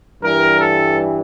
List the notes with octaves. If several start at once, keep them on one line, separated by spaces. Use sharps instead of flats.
G2 E3 G3 A#4
A4